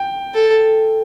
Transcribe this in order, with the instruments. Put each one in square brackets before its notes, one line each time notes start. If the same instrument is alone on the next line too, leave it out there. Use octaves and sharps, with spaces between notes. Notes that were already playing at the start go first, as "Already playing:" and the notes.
Already playing: [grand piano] G5
[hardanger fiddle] A4